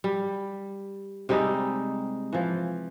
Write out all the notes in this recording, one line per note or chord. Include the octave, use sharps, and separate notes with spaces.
G3
C3 G3 G#3 D#4
E3 F3